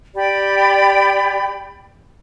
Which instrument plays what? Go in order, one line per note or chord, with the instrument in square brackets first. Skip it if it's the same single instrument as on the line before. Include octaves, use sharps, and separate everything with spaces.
[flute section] G4 D5 G5 B5